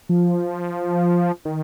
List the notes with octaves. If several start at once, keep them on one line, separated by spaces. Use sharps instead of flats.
F3
D#3